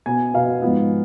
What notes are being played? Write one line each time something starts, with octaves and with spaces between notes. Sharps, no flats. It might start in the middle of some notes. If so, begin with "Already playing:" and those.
B2 B3 G#5
B2 B3 F5
G#2 F3 B3